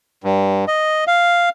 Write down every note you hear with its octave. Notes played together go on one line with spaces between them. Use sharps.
G2
D#5
F5